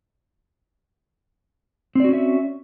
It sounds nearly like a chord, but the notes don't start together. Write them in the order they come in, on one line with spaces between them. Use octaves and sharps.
C4 D5 F#4 C#4 E5